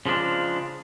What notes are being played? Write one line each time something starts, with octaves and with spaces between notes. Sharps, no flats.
C#3 F3 G#3 D4